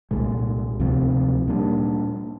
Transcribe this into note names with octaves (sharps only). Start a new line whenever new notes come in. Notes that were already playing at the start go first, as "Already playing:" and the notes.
C2 A#2 G#3
D2 C3 F3 C4
A#2 G3 A#3 D4